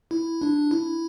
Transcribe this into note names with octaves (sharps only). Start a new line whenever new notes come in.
E4
D4
E4